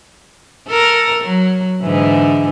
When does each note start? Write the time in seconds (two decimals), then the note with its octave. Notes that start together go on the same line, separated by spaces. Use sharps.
0.68 A4 A#4
1.24 F#3
1.82 G#2 D3 E3